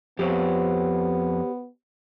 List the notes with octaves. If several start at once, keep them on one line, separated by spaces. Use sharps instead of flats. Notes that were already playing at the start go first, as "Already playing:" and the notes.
F2 B3 G4 C5 C#5